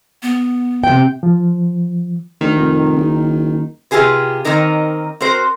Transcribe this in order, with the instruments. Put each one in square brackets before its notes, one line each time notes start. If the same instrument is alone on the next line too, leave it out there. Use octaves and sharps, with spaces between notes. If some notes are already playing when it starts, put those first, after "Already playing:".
[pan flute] B3
[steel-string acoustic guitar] C3 G5
[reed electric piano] F3
[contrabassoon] D2 [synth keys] D#3
[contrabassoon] F1
F#1
[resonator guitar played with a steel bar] C3 F4 G4 G#4 B4
D#3 A#3 C4 D#4 A#4
C4 F#4 A#4 C5